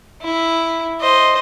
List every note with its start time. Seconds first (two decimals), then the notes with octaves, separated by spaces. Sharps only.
0.22 E4
1.00 C5 D#5